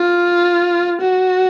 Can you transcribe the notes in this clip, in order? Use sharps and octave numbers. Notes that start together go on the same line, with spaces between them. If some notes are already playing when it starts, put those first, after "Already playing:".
Already playing: F4
F#4